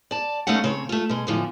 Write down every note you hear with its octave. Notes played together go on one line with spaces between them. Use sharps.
D5 A5
D#2 A3 C#4 D#4 F5 F#5
C#3 C4 C#5
A3 F4
B2 G#3
F2 A2 D3 E3 F3